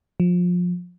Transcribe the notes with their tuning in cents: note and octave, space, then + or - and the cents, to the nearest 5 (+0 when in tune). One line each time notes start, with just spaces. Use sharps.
F3 +25